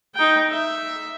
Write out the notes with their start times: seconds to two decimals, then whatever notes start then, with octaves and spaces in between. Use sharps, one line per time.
0.15 D#4 G5
0.50 E5